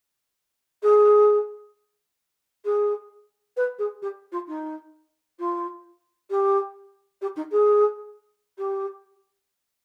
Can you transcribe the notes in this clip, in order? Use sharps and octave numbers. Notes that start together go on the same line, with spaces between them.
G#4
G#4
B4
G#4
G4
F4
D#4
F4
G4
G4
D#4
G#4
G4